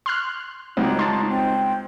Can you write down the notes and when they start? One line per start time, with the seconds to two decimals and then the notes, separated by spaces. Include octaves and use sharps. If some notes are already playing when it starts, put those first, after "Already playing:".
0.06 C6 F6 F#6
0.77 C#2 G3 C4 D#4 F#4
0.99 A5 C6
1.28 C4